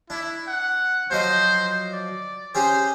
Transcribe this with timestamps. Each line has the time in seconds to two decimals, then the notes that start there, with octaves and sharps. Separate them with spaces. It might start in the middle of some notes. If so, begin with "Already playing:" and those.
0.10 D4 E4
0.48 F#5
1.11 F3 F#3 C5 D#5
1.93 D5
2.55 C#4 G4 G#4 C5